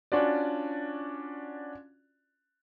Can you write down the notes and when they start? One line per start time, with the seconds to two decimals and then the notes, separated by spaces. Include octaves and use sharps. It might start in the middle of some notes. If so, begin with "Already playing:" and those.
0.12 C#4 D4 F4 F#4 D5